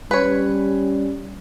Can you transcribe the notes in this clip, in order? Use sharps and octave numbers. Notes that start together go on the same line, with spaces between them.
G3 C#4 B4 C#5